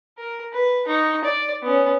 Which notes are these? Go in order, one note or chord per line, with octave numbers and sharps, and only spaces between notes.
A#4
B4
D#4 C#6
D5
B3 C#4